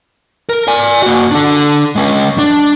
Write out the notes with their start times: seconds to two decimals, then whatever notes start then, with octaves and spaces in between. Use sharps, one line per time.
0.49 A#4
0.68 D5 G#5
1.03 A#3 F#4
1.31 D4 A4
1.96 G#3 C#4
2.38 D4